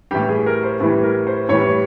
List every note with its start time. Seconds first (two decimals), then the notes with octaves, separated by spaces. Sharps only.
0.11 A2 E3 G3 G4
0.29 G#4
0.46 A#4
0.63 C5
0.80 A2 E3 G3
1.03 A#4
1.27 C5
1.49 A2 E3 G3 C#5